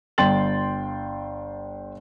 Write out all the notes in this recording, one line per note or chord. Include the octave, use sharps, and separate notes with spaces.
G1 G5 C6 A6 F#7